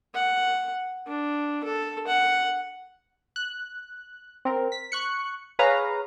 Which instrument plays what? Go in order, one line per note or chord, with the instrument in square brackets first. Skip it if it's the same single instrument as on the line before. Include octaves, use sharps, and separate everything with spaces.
[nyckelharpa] F#5
D4
A4
F#5
[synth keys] F#6
C4 A#4
B6
C#6 F#6 C#7
G#4 B4 C#5 F5 A#5